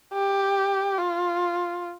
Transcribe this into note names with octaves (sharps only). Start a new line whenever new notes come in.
G4
F4